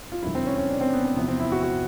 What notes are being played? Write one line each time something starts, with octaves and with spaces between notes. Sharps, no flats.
F4
E1 D#2 D3 F#3 E4
C4
C#4
C#4
D4
C4
B3
C4
E2 C3 F3 B3
C4
E4
F#4
F#4